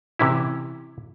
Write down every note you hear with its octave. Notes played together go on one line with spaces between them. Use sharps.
C3 E3 C#4 E4